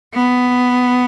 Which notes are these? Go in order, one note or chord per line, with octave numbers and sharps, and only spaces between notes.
B3